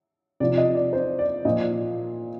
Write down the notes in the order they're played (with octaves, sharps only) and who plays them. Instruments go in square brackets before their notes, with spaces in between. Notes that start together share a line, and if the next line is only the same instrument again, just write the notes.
[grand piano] C3 F3 D5
D#5
D5
C5
D5
A#2 F3 D#5